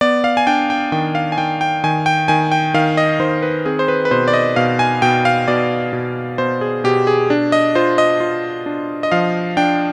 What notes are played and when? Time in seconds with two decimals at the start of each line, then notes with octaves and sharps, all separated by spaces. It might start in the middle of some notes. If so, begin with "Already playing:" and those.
0.01 B3 D5
0.24 F5
0.37 G#5
0.47 D4 G5
0.70 G5
0.92 D#3 G5
1.15 F5
1.32 G#5
1.38 D#3 G5
1.61 G5
1.84 D#3 G#5
2.06 G5
2.28 D#3 G#5
2.52 G5
2.74 D#3 F5
2.97 D#5
3.20 D#3 C5
3.42 B4
3.66 C4 G#4
3.79 C5
3.88 B4
4.05 B4
4.11 B2 C5
4.28 D5
4.33 D#5
4.56 B2 F5
4.79 G#5
5.02 B2 G5
5.25 F5
5.48 B2 D5
5.93 B2
6.38 B2 C5
6.61 G#4
6.84 B2 G4
7.07 G#4
7.30 D4
7.52 D#5
7.75 F4 C5
7.98 D#5
8.20 F4
8.66 D4
9.03 D#5
9.12 F3 F5
9.57 D4 G5